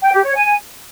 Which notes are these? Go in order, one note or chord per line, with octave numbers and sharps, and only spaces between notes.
G5
G4
C#5
G#5